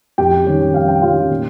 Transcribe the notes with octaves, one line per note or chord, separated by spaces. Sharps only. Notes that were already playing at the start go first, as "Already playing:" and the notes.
F2 G4 G5
D#3 G3 C#4
F2 F5
G5
D#3 G3 C#4 F4 F5
A#2